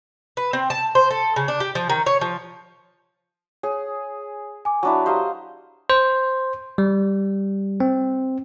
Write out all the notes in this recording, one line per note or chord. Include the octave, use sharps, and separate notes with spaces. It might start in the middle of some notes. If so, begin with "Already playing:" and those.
B4
C4
A5
C5
A4
C#3
D4
G4
F3
D#3
C#5
F3
G#4 C#5
G#5 D6
F#3 D4 E4
G4 C5 D#5 F5 A#5
C5
G3
C4